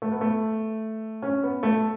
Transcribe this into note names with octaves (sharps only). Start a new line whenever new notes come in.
A3
B3
A3
C#4
B3
A3